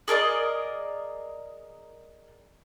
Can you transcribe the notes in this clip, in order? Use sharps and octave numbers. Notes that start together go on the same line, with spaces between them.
G#4 A#4 D5 D#5